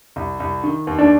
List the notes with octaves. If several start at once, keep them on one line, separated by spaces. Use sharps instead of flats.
C2
C2
D#3
D#2
D4